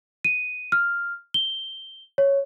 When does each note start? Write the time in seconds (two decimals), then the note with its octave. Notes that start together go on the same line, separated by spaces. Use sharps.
0.25 D#7
0.72 F6
1.34 G7
2.18 C#5